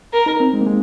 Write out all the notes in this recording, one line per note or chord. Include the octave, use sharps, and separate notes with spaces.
A#4
D#4
C4
G#3
A#3
G#3